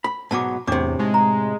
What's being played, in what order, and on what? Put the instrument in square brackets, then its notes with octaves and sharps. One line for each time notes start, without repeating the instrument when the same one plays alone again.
[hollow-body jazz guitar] B5
[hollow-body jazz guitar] G#2 B2 F#3 [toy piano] A5 D6
[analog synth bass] E2 [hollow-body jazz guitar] A2 C3 [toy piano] D4 D6
[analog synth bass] G#3 [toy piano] D#4 G4
[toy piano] A#5